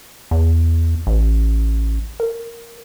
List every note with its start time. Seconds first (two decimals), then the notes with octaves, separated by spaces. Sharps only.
0.31 E2
1.07 A1
2.20 A#4